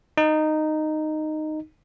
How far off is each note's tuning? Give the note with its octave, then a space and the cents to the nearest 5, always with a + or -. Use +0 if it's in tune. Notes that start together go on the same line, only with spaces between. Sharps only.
D#4 -10